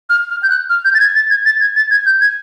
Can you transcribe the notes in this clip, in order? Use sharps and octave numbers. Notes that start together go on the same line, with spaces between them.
F6
F6
G6
F#6
F6
G6
A6
G#6
A6
G#6
A6
G#6
A6
G#6
G6
G#6